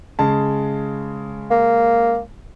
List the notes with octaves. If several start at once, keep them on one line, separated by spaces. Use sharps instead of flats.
C#3 G#3 A5
A#3